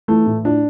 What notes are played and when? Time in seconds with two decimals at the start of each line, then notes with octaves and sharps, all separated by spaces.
0.08 E3 A3
0.26 A2
0.45 D4